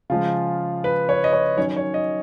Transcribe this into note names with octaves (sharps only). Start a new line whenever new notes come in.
C#3 F3 G#3 F4
B4
C#5
D#5
C#5
D#3 F#3 C#4 C#5
C#5
D#5